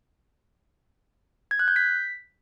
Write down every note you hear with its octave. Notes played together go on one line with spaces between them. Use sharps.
G#6
F#6
G6
B6